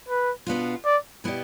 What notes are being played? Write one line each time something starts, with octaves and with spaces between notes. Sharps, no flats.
B4
B2 B3 D4 F4
D5
B2 B3 E4 G4 D5